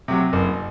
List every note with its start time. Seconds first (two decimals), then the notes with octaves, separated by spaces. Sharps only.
0.08 C3 F#3
0.33 F#1